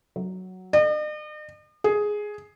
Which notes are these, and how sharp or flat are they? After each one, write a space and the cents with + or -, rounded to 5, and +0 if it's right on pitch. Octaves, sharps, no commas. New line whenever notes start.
F#3 +5
D#5 -45
G#4 +5